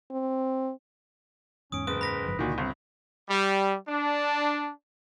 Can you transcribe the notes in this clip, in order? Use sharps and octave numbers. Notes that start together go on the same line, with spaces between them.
C4
E2 G#2 C#4 D#6 D7
F#1 B4 D#6
B5 A#6 B6
F#1 G#2 F3
C#2 A#2 D3 D#3 F#4
G1 C4
G3
D4